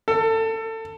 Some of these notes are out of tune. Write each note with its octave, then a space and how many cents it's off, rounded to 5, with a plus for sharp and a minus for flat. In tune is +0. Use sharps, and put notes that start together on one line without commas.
A4 +25